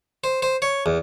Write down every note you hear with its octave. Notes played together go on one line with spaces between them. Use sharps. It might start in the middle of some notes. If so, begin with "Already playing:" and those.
C5
C5
C#5
E2